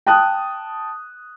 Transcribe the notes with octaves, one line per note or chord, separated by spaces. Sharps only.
G5 A5 D#6 F#6